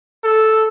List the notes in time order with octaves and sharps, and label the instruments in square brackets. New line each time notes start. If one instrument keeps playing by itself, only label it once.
[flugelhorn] A4